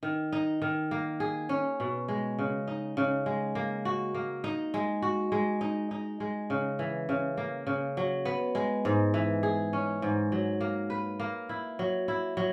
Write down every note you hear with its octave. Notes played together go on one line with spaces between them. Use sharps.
D#3
D#4
D#3
A#3
G#4
C#4
B2
G#3
C#3
D#4
C#3
G#3
A#3
F#4
A#3
D#4
G#3
F#4
G#3
D#4
D#4
G#3
C#3
E3
C#3
A#3
C#3
F#3
B3
G#3
G#2
E3
G#4
C#4
G#2
F#3
A#3
B4
A#3
E4
F#3
E4
F#3